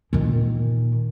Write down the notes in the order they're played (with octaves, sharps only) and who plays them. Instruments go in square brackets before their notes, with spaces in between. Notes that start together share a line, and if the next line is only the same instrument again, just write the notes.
[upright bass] A#2 D#3